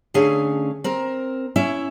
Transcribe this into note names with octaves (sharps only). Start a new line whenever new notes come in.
D3 A3 C#4 G#4 F5
C4 A#4
C#4 E4 E5